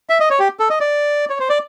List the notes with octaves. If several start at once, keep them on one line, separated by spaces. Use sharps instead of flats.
E5
D#5
C#5
G4
A4
D#5
D5
C#5
C5
D5